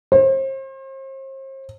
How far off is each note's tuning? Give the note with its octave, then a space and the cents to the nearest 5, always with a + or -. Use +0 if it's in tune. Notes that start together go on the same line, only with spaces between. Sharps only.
C5 +40